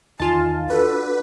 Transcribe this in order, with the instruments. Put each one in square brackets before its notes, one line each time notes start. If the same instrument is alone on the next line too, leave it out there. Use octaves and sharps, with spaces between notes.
[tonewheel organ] E2 D#3 [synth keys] F4 A5 [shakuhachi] G#5
[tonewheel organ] D4 F#4 [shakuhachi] A4 [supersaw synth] B4